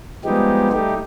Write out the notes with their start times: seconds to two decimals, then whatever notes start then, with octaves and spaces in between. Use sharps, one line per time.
0.25 F3 G3 G#3 B3 D#4 G4
0.73 G3 A3 D#4 G4